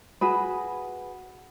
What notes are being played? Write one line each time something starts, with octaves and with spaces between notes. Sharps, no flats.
F#4 G#4 B4